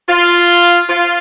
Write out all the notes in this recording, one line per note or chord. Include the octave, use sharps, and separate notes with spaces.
F4
F4